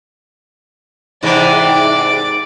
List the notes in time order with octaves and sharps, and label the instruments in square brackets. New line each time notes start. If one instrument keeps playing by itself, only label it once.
[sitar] G#2 C3 E3 [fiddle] D5 D6